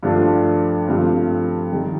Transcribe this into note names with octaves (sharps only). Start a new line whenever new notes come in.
G2 F3 A3 D4 F4
G2 F3 A3 C4 F4
D#3 G3